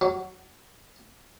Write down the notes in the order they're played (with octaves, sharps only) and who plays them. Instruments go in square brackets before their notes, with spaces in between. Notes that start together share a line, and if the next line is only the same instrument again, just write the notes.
[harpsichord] F#3